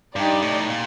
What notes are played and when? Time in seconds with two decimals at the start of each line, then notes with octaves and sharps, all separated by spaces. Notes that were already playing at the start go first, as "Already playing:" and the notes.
0.16 G2 D#4 G4 D5
0.42 A2
0.69 A#2